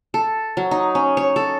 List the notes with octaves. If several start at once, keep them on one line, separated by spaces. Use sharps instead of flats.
A4
F#3
D#4
C#4
C#5
A4